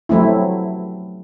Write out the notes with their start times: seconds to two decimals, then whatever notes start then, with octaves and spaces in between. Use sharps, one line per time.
0.09 F#3 A3 C4 E4